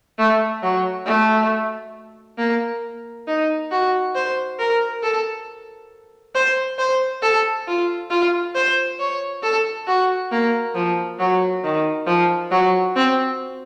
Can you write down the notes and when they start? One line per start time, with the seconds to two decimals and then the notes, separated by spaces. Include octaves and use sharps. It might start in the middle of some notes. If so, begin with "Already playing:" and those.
0.19 A3
0.63 F#3
1.06 A3
2.38 A#3
3.27 D#4
3.71 F#4
4.15 C5
4.59 A#4
5.03 A4
6.35 C5
6.78 C5
7.22 A4
7.67 F4
8.10 F4
8.55 C5
8.99 C#5
9.43 A4
9.87 F#4
10.32 A#3
10.75 F3
11.19 F#3
11.64 D#3
12.07 F3
12.51 F#3
12.96 C4